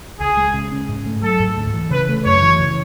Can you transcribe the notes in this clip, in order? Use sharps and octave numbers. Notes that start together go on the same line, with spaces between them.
C#2 G#4
G#3
C#3
C#4
G#2
A3
F#3 A4
G#2
D2
E3
C#3 B4
A3
F#2 C#5
E3
C#3